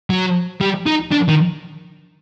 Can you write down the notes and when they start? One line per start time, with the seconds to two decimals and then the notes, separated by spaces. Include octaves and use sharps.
0.10 F#3
0.61 G3
0.86 D#4
1.11 D4
1.28 D#3